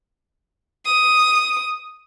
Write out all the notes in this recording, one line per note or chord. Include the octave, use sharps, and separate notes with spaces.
D#6